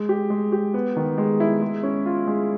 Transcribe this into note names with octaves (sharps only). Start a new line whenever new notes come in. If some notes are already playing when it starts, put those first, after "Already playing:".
Already playing: G#3
G4
G#3
G4
B3
D#3
G#3
E4
G#3
C#4
F4
G#3